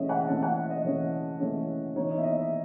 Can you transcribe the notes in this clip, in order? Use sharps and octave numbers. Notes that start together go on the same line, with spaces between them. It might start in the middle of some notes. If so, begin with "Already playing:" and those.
Already playing: C#3 E3 A3 C#4 C#5 D#5 E5
F#5
C#3 E3 A3 C#4 A5
F#5
D#5
C#3 E3 A3 C#4 C#5
C#3 E3 A3 C#4
E3 B3 D#4 C#5
D#5
E5
D#5
E5